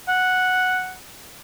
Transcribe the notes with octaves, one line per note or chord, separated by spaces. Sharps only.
F#5